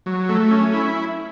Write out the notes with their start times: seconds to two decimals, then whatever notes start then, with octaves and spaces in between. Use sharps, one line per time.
0.06 F#3
0.29 A3
0.51 C#4
0.74 E4